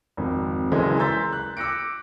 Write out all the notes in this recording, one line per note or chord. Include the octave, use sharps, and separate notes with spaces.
G#1 F2
F#1 F#2 E3 G#3 D5 D#5
A#5 C6 E6 G6 A6 B6
F#6
D6 E6 F#6 A#6 C#7 D7